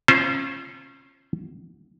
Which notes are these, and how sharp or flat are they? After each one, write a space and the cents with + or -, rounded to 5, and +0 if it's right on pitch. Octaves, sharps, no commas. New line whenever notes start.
C#4 -25 F4 -20 C5 +0